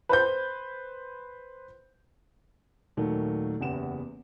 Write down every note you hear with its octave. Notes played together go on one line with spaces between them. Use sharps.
B4 C5 G6
D#2 A#2 D#3 F#3 A3
F#1 E2 B3 G4 E7